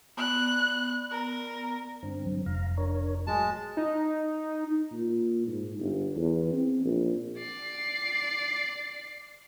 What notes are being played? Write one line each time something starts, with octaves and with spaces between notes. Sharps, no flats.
B3 D5 F#6
A#4
G2 D3 C4
F#3
F1 F5 A#5
D4 A#4 C#5
A2 F#3 G#3 A5
D#4
A#2
G#2
G1
E2
C4
A#1
D5 C7